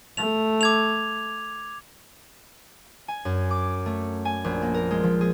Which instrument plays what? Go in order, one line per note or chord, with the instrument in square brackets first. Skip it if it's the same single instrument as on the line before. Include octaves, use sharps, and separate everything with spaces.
[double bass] A3 [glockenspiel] F7
[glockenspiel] D6 G#6 F7
[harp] G#5
F#2
D6
A3
G#5
A#1
A#3
A#4
G#3
F3
G#4